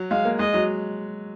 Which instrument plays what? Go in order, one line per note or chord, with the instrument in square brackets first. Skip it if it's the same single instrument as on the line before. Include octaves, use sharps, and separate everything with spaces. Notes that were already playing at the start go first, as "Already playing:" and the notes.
Already playing: [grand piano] F#3
[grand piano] G#3 [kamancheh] F5
[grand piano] A#3
[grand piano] G#3 [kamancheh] D#5
[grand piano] F#3